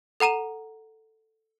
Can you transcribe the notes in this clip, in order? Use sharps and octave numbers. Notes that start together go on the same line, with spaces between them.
A4 F#5 A#5 D#7 E7